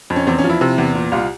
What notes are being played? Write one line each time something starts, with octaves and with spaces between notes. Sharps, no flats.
F2
C#4
E2 C4
C#4
F3
E4
C3
E2
A#2
C2 F4